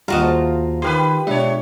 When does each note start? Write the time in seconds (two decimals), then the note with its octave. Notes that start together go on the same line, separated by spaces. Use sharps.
0.08 D#2 G3 F4 F#4 D#5 A#5
0.23 G#4 C5 A5
0.82 D#3 G4 A#4 B4 C6
1.27 B2 G#3 D4 C#5 E5